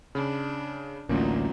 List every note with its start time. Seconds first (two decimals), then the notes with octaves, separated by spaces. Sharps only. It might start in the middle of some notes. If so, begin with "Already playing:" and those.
0.15 C#3 D4 B5
1.09 A1 D2 F#3 A#3 C#4 D#4 F4